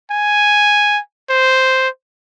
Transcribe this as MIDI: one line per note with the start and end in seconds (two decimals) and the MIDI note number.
0.11 0.99 80
1.30 1.88 72